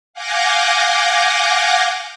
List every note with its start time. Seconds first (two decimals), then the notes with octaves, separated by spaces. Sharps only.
0.14 F5 F#5 G#5 D6 G6 A#6